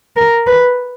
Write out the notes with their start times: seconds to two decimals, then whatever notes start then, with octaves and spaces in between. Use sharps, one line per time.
0.17 A#4
0.47 B4